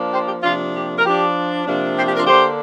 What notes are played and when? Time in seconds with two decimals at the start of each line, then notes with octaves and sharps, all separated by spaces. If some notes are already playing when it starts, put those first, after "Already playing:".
Already playing: F3 A#3 D4
0.12 G4 C5
0.28 G4
0.43 C3 F3 A#3 D4 F4
0.74 G4
0.98 A#4
1.05 F3 D4 G4
1.66 C3 F3 A#3 D4
1.96 G4 C5
2.06 G4
2.16 F4 A#4
2.27 D3 A#3 D4 G4 C5